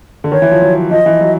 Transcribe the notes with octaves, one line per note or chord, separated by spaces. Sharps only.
D3
D#3 C#5
E3
F3
F#3
F3 D#5
E3
F#3